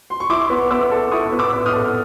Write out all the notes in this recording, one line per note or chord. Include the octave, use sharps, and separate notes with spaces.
C6
C#6
E4 C6 D6
B3
B3 D6 E6
A4
E4 C#6 D#6
B3
D6 E6
B3
D#6 F6
A4